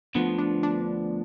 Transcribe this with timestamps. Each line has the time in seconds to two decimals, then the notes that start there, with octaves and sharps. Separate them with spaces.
0.15 D2 D3 F3 B3
0.38 D4
0.63 D4